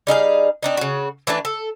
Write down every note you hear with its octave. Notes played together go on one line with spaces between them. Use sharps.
G3 D#4 G#4 F5
C4 D4 D#4
C#3 F#4
E3 A3 D4 D5
A4